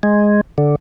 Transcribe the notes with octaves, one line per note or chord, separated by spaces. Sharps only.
G#3
D3